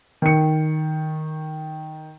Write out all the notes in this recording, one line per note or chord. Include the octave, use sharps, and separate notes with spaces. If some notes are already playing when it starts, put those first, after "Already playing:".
D#3 C#7